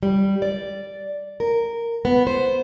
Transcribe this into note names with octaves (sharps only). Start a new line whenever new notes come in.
G3
D5
A#4
B3
C5